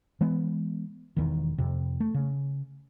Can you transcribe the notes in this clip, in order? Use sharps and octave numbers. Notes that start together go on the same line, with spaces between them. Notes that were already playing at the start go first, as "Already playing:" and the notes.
E3 G#3 B3
E1 E2 D#3
F2 C3
A3
C#3